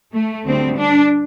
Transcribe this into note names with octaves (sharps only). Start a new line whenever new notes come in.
A3
D2 D3 G3 C4
D4